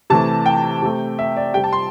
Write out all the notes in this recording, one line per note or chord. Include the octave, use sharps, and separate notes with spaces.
C3 E3 A3 A5
G5
C3 A3
E5
D5
C3 G3 G5
A5
C6